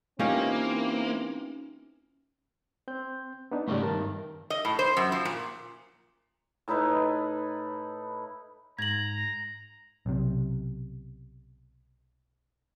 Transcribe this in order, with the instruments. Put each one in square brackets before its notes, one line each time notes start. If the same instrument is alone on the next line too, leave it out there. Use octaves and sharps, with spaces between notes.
[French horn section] E3 C4 [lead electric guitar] A#3 [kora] C#4 D#4 G4 [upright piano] F4
[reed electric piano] C4 G6
B3 D4 D#4
[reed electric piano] G#2 C#3 G3 [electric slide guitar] A3 C#4 G4
[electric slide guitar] G2 D#3 [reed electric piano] A#4 A5
[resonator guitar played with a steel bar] D#5
A2
C5
F#2
F3
A#2
[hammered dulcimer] A2 D#4 E4 B4
[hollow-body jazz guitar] G#2 [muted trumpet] A#5 [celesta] G#6 F#7
[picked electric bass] B1 C3